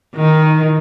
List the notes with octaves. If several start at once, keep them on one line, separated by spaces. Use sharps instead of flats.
D#3